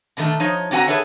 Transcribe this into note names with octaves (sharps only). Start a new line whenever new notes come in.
B2 D3 D#3 A3
F3 D#4 C#5
D3 C4 F#4 F#5 G#5 A#5
G#4 A4 B4 C#5 E5